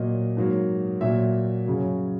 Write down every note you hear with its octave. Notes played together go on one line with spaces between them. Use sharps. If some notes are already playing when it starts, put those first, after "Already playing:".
Already playing: A#2 F#3 A#3 D#5
G#2 F#3 A#3
A#2 F#3 A#3 E5
F#2 C#3 F#3